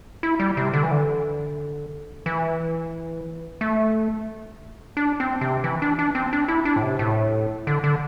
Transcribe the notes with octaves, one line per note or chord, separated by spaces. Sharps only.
E4
G3
C3
D3
E3
D3
E3
A3
D4
C4
C3
E3
D4
D4
C4
D4
E4
D4
A2
C3
A2
D3
D3